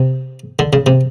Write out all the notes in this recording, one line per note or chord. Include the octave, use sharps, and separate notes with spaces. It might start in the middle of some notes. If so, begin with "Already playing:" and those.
Already playing: C3
D3
C#3
C3